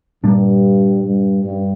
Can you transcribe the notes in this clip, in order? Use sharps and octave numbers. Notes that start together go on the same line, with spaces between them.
G2 A#2 G3 A#3 D4
G2
G2